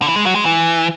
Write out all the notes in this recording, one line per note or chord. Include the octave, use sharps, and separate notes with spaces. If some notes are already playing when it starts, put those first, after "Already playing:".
D3
E3
G#3
F#3
G#3
E3